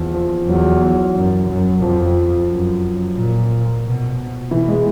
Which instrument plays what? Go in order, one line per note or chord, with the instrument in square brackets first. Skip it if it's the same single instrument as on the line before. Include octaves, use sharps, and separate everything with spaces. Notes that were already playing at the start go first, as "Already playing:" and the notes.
Already playing: [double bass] E2 [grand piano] F3
[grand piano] F3
[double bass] E2 [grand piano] F#3
[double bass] F#2
F#2
[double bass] F2 [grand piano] F3
[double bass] F#2
A#2
B2
[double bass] B2 [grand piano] E3
[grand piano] G#3